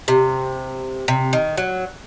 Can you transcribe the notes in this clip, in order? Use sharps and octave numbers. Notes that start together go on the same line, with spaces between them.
C3
C3
D#3
F#3